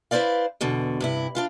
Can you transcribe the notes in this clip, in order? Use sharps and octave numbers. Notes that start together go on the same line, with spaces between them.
E4 B4 C5 D5 F5
E2 B2 D3
G2 C3 E4
D4 F4 F5